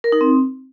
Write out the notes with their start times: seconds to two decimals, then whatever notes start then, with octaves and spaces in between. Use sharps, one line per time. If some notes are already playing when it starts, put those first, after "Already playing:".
0.04 A#4
0.12 D#4
0.21 C4